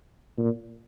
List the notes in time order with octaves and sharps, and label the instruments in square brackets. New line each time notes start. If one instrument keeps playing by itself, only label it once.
[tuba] A#2